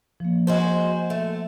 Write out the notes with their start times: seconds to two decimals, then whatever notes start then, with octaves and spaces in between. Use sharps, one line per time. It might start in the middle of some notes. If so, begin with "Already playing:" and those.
0.20 F3 A#3
0.47 G#3 F#4 C5
1.10 A3